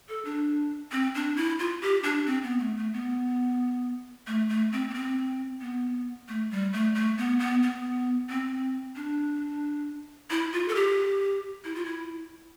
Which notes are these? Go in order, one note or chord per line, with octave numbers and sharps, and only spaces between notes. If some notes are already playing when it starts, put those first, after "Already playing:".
A4
D4
C4
D4
E4
F4
G4
D4
C4
B3
A3
A3
B3
A3
A3
C4
B3
C4
B3
A3
G3
A3
A3
B3
B3
B3
C4
D4
E4
F4
A4
G4
E4
F4
E4